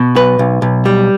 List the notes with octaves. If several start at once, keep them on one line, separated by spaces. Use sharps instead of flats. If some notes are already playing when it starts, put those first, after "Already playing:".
Already playing: B2
B1 B4
B1
B1
G3